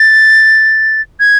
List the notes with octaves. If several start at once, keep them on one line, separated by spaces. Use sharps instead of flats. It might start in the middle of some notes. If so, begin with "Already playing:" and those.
Already playing: A6
G#6